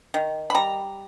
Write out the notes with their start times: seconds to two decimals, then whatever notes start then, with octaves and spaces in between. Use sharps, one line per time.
0.14 D#3
0.50 B5
0.54 G3 A#5